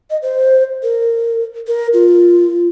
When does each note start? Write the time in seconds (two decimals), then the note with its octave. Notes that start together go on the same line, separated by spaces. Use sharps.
0.10 D#5
0.22 C5
0.83 A#4
1.67 A#4
1.93 F4